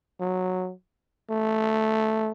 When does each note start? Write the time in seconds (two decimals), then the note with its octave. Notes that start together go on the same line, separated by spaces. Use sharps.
0.20 F#3
1.30 A3